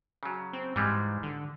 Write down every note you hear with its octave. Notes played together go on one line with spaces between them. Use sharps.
C#3 F#3
C4
G#2 E3 G3 G#3
D3